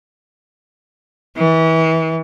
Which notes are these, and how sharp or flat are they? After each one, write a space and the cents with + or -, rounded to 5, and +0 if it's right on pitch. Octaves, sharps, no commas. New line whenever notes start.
E3 -30